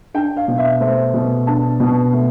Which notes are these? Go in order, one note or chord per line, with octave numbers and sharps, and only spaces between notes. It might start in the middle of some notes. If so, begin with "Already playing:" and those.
D4 G5
F5
B2
E5
A3 C5
B2
D4 A5
B2
A3